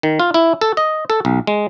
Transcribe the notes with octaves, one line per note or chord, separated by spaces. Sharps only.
D#3
F4
E4
A4
D#5
A4
B1
G#3